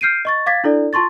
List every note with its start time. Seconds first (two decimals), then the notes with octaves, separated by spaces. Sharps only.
0.01 F6 G6 C7 D7 D#7
0.25 D#5 C#6 A6
0.46 F5 D6 G#6 A6 B6
0.64 D4 E4 A4 D5
0.93 F4 A5 C6 C#6 A6